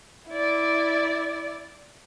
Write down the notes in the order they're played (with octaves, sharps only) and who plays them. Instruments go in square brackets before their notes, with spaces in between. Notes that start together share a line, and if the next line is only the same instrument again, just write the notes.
[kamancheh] E4 D5